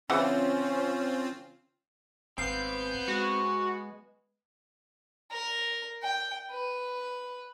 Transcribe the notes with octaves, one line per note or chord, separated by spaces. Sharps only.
C#3 E3 C4 C#4 F4 F#5
G#1 B3 C4 F5 G6
G#3 F#4
A#4
G5
B4